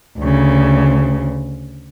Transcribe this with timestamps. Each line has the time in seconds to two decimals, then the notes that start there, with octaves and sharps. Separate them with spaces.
0.19 D2 C#3